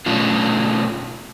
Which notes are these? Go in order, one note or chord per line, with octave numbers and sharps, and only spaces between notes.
B2 A3 C#4 D4 F4